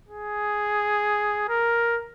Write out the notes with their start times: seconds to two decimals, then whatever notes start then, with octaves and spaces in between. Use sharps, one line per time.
0.09 G#4
1.48 A#4